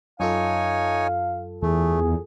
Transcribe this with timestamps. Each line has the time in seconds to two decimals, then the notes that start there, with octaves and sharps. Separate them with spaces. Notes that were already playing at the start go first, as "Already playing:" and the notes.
0.20 F#2 D#4 F4 A4 C#5 F5 G#5
1.63 E2 A3 G#4